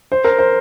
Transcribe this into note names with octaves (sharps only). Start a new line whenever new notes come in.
C5
A#4
C5